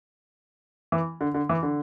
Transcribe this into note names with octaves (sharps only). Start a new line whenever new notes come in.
E3
D3
D3
E3
D3